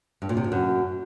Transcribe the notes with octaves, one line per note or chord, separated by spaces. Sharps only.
G2
A#2
C3
F2
F#2